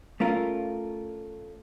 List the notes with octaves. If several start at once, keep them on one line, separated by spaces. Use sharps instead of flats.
A3 C#4 F4 A#4